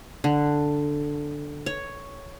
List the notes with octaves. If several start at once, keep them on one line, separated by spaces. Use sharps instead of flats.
D3
C#5